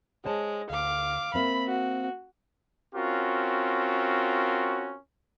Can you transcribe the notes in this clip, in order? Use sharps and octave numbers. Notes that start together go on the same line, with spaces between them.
G#3 C5 C#5 A5
D2 F5 D6
A#3 C4 E5 B5
F#4
C4 C#4 F4 F#4 A#4